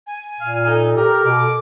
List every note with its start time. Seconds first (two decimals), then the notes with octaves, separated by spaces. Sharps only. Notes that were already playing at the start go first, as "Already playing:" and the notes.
0.07 G#5
0.41 A#2 F5
0.66 D#4 A4
0.96 G4 A#4 A#5
1.25 B2 D6